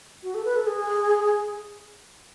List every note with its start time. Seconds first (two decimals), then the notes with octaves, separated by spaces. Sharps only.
0.23 F#4
0.34 A4
0.45 B4
0.56 A4
0.66 G#4